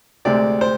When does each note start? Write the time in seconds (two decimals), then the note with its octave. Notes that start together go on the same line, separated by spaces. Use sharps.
0.25 D2 C3 G#3 C4 D5
0.61 C5